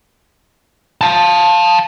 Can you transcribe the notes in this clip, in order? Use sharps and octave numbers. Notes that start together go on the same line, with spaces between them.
F5 A5